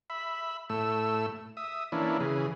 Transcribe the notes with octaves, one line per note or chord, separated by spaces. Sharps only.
E5 B5
A2 A3 E6
E5 D#6
E3 A#3 C#4 D4 E4
C#3 E3 G#4